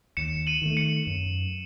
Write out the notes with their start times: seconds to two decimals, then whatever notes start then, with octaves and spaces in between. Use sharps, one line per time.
0.17 D#2 C#7 E7
0.47 D#7 F#7
0.62 D#3 A3
0.77 C#7 E7
1.07 F#2